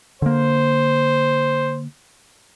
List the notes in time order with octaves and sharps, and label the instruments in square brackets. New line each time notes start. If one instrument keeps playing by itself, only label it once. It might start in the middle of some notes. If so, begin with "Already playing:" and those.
[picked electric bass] D3 A#3 [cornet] C5